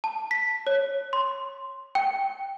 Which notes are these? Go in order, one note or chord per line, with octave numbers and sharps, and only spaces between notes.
A5
B6
C#5
C6
G5